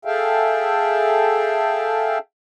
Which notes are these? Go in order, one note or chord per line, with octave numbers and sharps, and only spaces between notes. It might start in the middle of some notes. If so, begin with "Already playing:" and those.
G#4 A4 E5 F5 G5